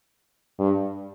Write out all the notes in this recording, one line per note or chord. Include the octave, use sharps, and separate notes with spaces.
G2